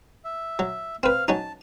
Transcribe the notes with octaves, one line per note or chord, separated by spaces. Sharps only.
E5
F#3
C4 B4 F5 F6
F#3 C#4 D#4 A5